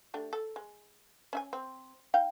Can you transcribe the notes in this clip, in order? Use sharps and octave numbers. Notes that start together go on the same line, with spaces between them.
A3 D4 G4
A4
G#3
C#4 E5 G#5
C4
D#4 F5 G5